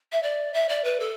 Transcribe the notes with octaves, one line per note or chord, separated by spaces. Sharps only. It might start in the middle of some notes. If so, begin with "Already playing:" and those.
E5
D5
E5
D5
B4
A4